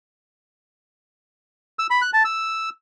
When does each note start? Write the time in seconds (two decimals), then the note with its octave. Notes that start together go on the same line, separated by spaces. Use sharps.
1.79 E6
1.90 B5
2.02 F#6
2.13 A5
2.25 E6